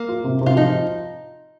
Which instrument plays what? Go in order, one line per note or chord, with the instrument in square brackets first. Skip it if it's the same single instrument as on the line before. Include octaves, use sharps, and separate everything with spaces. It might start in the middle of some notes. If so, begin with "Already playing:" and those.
Already playing: [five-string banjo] A#3
[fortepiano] F4
C3
C3
[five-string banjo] F4
[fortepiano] F3 [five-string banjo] D#4